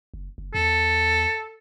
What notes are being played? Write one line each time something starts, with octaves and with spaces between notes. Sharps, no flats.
F#1
F#1
E2 A4